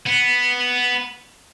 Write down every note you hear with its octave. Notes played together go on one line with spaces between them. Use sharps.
B3